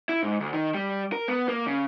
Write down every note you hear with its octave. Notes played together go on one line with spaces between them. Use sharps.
E4
G#2
D2
D#3
G3
A#4
B3
A#3
C#3